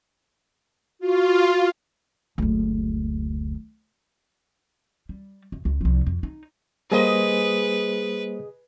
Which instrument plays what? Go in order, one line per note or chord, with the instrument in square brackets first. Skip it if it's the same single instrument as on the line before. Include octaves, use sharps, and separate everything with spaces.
[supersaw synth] F4 [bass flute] F#4
[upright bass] F#1 D2
G3
E2
C#2 E4
C2 F3
F2
D#4
[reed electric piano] G3 A#3 C5 [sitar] G#4 D#5 [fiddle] B4